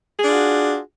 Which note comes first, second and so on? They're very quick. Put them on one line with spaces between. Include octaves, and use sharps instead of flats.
G#4 D4 F4 F#4